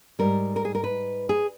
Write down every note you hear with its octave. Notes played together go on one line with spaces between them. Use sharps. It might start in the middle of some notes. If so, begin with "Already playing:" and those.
G#2 G3 A#4
A#4
G#4
A#4
B4
G#4